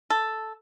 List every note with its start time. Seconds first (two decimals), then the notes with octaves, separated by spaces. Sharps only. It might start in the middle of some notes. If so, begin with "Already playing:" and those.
0.10 A4